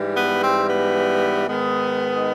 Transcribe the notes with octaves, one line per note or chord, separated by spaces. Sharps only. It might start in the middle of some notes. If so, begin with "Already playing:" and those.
Already playing: G#2 E3 G3
B3
C4
B3
G#2 D#3 G#3 B3